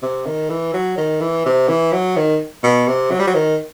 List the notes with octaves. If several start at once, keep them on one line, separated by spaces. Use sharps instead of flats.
C3
D#3
E3
F#3
D#3
E3
C3
E3
F#3
D#3
B2
C3
F#3
G3
F#3
D#3